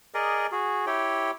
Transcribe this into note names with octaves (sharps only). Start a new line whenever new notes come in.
G#4 A#4 D5 D#5
F#4 G#4
E4 G4 C#5 G5